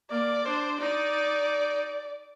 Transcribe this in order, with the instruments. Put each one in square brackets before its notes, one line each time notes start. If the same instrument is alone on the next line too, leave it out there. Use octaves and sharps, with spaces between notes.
[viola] A#3 [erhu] D5
[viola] D4 [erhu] C5
[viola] D#4 [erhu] D5